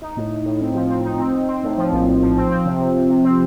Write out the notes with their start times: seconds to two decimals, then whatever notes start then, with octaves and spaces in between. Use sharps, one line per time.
0.02 D#4
0.17 A2
0.31 A2
0.46 A2
0.61 C4
0.75 F3
0.90 C4
1.05 D#4
1.19 C4
1.34 C4
1.49 C4
1.63 A2
1.78 F3
1.92 A#1
2.07 A#1
2.22 F3
2.37 C4
2.51 C4
2.66 C3
2.81 C3
2.95 C3
3.10 C3
3.24 C4